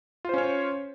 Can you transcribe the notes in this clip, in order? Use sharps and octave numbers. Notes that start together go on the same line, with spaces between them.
C#4 F4 C5 C#5